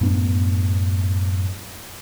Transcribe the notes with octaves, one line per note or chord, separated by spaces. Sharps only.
F#2 A2 B3 D4